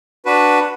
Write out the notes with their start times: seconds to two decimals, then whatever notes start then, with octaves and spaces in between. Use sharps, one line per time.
0.26 D4 F#4 B4